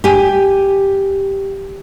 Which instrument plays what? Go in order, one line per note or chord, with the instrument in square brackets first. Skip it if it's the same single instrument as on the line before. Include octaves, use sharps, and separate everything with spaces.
[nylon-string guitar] G4 G#5